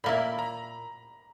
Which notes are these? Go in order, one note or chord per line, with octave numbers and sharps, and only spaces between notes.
A#2 A#3 E4 B5
A#5